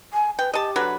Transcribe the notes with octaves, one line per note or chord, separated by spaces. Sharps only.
G#5
B4 G5
G4 D#5 A5
D3 F#3 B4